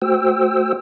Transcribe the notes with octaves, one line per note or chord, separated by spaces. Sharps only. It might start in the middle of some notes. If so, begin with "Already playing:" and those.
A3 F#4 C5 G5 E6